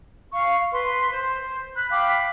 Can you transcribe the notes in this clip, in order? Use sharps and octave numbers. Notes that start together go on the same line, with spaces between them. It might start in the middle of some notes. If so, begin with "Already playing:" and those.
F5 C#6
B4 C6
C5
B5 F#6
F5 G5 B5 D6